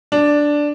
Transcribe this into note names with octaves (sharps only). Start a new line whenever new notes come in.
D4